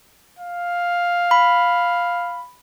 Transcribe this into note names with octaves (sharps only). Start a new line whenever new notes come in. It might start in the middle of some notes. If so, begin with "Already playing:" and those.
F5
B5